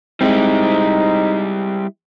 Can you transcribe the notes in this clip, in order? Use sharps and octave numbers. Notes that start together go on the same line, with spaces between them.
G3 G#3 C4 D#4 E4